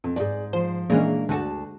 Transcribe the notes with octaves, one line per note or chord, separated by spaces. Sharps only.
F2
F2 G#2 G#4 D5
F3 C5
A#2 E3 G#3 A#3 C#4 D4
D2 D3 F#4 G#5 A5